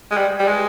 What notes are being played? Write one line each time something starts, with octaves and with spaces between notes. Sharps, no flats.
G#3
G3
G3
G#3